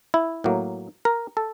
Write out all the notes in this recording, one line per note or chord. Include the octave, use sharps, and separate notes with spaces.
E4
A2 F#3 A#3
A#4
A4